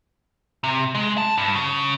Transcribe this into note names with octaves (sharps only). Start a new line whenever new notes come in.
C3
G#3
A5
G2
C#3